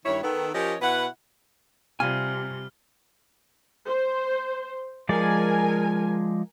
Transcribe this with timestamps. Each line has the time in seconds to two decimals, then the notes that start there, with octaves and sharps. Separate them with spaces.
0.06 G2 D#3 E4 C#5
0.23 D#3 B3 A4
0.54 F3 C#4 G4 A#4 C#5 D#5
0.82 B2 E4 B4 F#5
2.00 C3 G3 F4 G#5 F6
3.87 C5
5.09 F3 G#3 A#4 D5 G#5